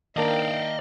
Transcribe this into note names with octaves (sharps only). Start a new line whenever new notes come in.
D#3 A#3 D4 A#4 D5 D#5 F5 G5